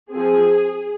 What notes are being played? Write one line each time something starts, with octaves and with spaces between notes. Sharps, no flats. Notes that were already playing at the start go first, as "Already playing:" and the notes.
F3 C4 G#4